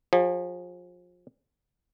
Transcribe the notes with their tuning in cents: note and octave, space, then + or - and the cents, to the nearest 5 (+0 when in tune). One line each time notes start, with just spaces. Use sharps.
F3 +30 G#4 -30